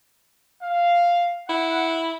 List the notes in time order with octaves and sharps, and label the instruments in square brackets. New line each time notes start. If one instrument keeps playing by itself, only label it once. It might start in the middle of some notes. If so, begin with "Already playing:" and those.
[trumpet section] F5
[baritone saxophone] E4 [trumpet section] F#5